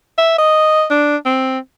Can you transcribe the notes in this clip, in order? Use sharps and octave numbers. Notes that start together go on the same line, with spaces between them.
E5
D#5
D4
C4